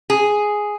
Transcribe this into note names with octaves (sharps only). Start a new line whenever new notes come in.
G#4